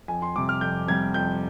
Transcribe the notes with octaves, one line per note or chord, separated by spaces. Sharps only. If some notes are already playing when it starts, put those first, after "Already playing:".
F2 G#5
C6
C3 G3 D6
F6
F2 G6
C3 G3 G#6
F2 G6